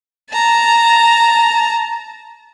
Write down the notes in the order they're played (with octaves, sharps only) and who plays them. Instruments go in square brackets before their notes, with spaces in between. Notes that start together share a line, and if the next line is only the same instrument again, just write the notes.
[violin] A5 A#5